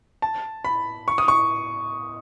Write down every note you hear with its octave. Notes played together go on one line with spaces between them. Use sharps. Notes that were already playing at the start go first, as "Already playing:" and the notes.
A5
B5
C#6
D#6
C#6